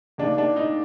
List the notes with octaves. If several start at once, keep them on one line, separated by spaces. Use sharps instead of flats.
D#2 D#3 D4
D4
D#4